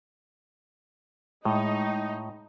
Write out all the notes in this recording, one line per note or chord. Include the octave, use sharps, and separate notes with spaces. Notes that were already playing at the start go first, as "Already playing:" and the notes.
A2 G#3 D#4